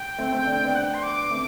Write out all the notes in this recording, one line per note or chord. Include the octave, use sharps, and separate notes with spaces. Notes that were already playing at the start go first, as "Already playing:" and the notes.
Already playing: G5
A3 C4
A3 C4
D4
C4
B3 D4
F#5
G5
C6
D6
A3 C4